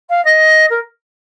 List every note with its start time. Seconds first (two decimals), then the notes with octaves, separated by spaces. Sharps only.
0.09 F5
0.25 D#5
0.70 A#4